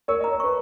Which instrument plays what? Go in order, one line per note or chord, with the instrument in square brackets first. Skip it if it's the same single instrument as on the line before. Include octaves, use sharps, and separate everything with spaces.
[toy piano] A#4 [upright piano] C#5
[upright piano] D#5 [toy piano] A#5
[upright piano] C#5
[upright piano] B4 [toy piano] C#6